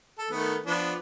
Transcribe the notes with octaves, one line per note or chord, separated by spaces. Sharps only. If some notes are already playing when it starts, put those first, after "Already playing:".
A4
D#3 A3 B3
F3 B3 D4